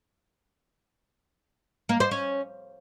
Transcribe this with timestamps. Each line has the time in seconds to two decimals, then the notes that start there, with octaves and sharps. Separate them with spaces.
1.89 A#3
2.00 C5
2.11 C#4